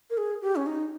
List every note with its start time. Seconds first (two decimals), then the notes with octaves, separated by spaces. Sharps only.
0.10 A#4
0.17 G#4
0.42 G4
0.56 C#4
0.66 D#4